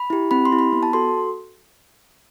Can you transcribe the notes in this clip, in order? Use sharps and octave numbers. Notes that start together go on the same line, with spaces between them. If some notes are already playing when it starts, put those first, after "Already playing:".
Already playing: B5
E4 G4
C4 B5
C6
E4 G4
B5
B3
A5
F#4 A4 C6